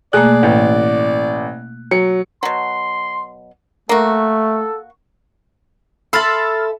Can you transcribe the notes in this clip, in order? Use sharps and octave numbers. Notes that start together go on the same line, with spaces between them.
B2 A3 A#3 G#4 D5 F#6
A1
F#3 C#7
B2 F#3 C6
A3 A#3 F#4 A4
A4 E5 B5 C6 E6 F6 A6